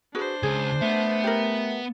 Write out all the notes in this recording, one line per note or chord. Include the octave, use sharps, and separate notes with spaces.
D4 F#4 G#4 B4 C5
C#2 G#4
A3 B3
G4 A#4